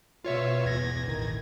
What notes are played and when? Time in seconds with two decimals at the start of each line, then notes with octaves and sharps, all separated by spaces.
0.25 B2 B3 F4 C#5 E5
0.65 E2 G#6 A#6
1.03 A1 D#3